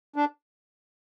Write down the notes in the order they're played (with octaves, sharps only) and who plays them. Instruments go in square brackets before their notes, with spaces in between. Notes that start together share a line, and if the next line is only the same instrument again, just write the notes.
[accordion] D4